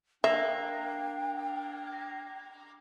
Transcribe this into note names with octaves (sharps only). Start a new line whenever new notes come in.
A#3 D4 E5 G5